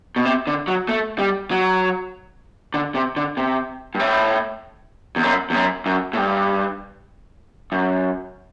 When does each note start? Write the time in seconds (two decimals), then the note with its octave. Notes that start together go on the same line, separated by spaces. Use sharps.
0.16 B2
0.25 C3
0.47 D3
0.68 F#3
0.89 A3
1.19 G3
1.51 F#3
2.74 D3
2.95 C3
3.16 D3
3.37 C3
3.95 G2
3.99 A2
5.16 E2
5.23 F#2
5.50 E2
5.55 F#2
5.86 F#2
6.13 A2
6.17 G2
7.72 F#2